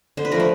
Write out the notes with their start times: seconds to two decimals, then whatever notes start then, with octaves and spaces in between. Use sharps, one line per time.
0.17 D3 C5
0.25 B4
0.31 F3 A3 A#4
0.40 B4